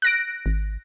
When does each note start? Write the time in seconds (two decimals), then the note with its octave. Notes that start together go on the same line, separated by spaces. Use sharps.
0.02 F#6 A#6 D7
0.46 G#1